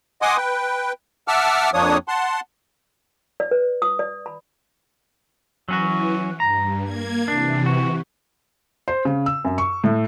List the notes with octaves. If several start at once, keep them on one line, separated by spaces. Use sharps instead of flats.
D#5 F#5 G#5 C6 D6 D#6
B4 G5
E5 F#5 A5 D6 E6 F6
F2 F3 A#3 D4 C#5 D#6
F#5 A5 C6
D5
B4
D#6
D5
B5
E3 F#3 C#4 F#4
G2 A#5
A#3 G#6
C3 E3 D4
F#4
C5
C#3
E6
F#2
C#6
A2